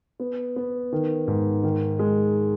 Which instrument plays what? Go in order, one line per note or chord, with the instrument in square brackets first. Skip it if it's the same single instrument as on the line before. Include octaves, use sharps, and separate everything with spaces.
[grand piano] B3
B3
D#3
G#2
D#3
G#3